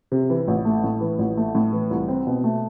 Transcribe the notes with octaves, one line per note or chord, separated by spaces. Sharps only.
C3
E3
A1
A3
A2
E3
A1
A3
A2
E3
C2
C4
B2
A3